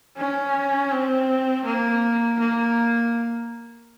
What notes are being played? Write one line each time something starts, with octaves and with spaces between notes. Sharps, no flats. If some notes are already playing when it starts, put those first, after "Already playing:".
C#4
C4
A#3
A#3